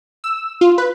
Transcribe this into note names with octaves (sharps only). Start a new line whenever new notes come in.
E6
F4
B4